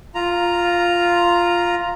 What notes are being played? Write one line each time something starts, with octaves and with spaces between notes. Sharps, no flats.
F4 A#5